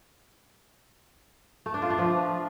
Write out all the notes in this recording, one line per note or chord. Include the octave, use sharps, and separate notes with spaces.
A3
D4
F4
D4
F3